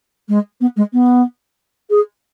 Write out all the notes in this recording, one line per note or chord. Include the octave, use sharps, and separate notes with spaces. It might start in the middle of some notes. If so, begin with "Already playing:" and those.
G#3
B3
G#3
B3
G#4